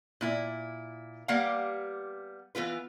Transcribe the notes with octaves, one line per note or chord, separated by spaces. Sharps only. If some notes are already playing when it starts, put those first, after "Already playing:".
A#2 E4
G3 A#3 B3 G4 F5 F#5
E3 B3 F4 B4